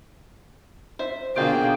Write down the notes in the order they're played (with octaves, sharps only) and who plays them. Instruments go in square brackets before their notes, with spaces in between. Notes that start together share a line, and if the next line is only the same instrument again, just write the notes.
[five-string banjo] C5 E5
[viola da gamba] B2 D3 F#4 [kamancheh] A#3 G#4 [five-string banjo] F4 F5 [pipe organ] G5